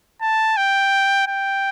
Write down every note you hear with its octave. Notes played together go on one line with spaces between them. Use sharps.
A5
G5
G5